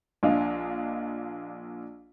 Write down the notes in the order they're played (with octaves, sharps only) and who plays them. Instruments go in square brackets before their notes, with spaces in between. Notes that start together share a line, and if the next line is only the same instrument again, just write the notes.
[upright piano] A#1 D4 D#5 F5